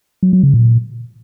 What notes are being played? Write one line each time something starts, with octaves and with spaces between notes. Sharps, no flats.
F#3
F#3
C#3
A#2